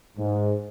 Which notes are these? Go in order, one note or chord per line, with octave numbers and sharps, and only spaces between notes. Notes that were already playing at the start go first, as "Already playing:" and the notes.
G#2